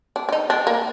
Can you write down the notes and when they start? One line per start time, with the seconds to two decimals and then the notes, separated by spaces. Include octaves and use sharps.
0.16 D4
0.29 D4
0.32 D#4
0.50 D4
0.67 A#3